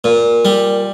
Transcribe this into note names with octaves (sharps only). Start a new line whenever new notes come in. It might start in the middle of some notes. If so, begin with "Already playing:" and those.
A#2
G3